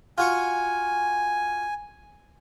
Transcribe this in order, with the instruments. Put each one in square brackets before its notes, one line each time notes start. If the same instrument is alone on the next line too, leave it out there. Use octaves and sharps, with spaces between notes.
[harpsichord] F4 F#4 C#6 [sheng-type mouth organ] G#5